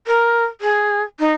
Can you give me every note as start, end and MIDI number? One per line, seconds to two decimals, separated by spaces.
0.07 0.45 70
0.61 1.03 68
1.19 1.32 63